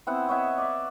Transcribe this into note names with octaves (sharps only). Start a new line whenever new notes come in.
B3 C4 E4 F#5
C#5 D#5 E5 F#5
D5 E5